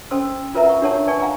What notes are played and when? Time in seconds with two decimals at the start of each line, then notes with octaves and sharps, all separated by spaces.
0.11 C#4 A4 C5 C6 E6
0.55 F4 A#4 B4 E5 A#5
0.66 F#5 C#6
0.82 D4 G4 A#4 C#5 F#5 A5
1.07 B4 D5 G#5 A5 C#6
1.22 F5 F#5 G#5 A#5